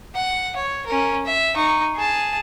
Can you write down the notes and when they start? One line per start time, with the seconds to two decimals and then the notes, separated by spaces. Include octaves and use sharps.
0.15 F#5
0.56 C#5
0.87 C#4 A#4
1.25 E5
1.55 D#4 C#6
1.95 G#4 A5